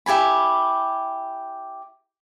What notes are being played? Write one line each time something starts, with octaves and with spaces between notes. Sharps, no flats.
E4 G4 G#5 B5